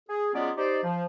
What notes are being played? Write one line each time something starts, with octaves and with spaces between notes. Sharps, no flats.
G#4
F#3 G#3 B3 C#4 F4 D5
D#4 G4 C5 D5
F3